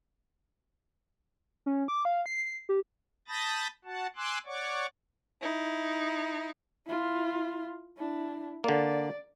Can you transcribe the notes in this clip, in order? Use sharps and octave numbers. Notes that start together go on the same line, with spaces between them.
C#4
D6
F5
C7
G4
A5 B5 D#6 G6 A6 A#6
F#4 F#5 A5
G#5 C6 D6 E6 F#6
C#5 D5 F#5 C#6 D6
D#4 E4
E4 F4
D4 E4
D3 A#3 D5